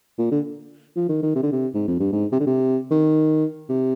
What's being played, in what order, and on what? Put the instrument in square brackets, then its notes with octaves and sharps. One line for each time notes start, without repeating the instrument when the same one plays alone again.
[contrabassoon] A#2
D3
F3
D#3
D#3
C3
D3
C3
G#2
F2
G2
G#2
C3
D3
C3
D#3
C3